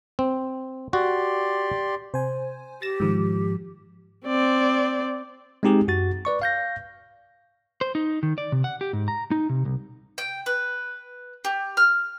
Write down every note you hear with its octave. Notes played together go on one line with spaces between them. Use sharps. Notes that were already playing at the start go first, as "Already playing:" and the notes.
C4
F#4 G4 D5 C6
C3 C5 G#5
G4 A6 A#6 E7
G#2 D#3 F3 G#3
C4 D5
G#3 C4 D#4 G4 G#4
F#2 F#4 A6
B4 D5 C#6
F5 G6 A#6
C5
D#4
D#3
D5
C3
F#5
G4
G#2
A#5
D#4
C3
C2
G5
B4
G4
F6